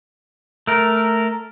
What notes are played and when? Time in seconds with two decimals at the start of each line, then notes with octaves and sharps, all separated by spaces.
0.67 A3 A#4